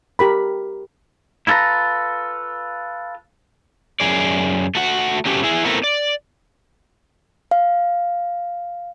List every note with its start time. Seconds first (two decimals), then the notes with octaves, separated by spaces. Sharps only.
0.19 G4 A#4 B5
1.47 E4 F4 A4 B4 A#5
4.00 F#2 G#4 D5
4.75 A3 F#4 F#5
5.25 F#3 A3 C#4 G4
5.43 E4 G#4
5.65 A3 B3 C4 E4 A4 A#4
5.84 D5
7.51 F5